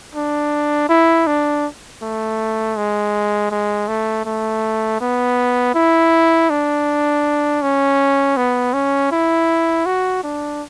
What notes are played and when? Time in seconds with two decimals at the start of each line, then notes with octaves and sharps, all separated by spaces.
0.15 D4
0.89 E4
1.27 D4
2.02 A3
2.76 G#3
3.51 G#3
3.88 A3
4.26 A3
5.01 B3
5.75 E4
6.50 D4
7.62 C#4
8.37 B3
8.74 C#4
9.12 E4
9.86 F#4
10.23 D4